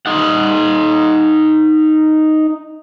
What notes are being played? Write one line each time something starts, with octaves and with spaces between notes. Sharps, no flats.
D#4 F#5